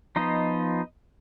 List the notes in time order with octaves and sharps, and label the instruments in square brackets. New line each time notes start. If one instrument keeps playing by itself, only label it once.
[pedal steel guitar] F3 B3 D#4 F4 D#5